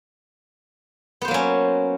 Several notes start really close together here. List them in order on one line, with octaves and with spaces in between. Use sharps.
B3 C5 A#3 F#3 C#4